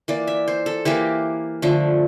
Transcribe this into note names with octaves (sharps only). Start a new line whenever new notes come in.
E3 A#3 D5
E5
C5
A4
E3 A#3 G4
D3 F3 A3